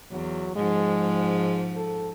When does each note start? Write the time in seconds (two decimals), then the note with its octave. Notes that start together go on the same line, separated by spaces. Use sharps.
0.11 E2 F#3
0.56 G#2 F3 G#3
1.76 A4